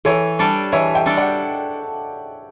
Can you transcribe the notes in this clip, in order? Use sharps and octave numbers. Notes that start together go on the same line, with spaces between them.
E3 A4 C#5
G3 D4 A4
E3 C#5 E5
E5 G5
G3 D4 A4
D5 F#5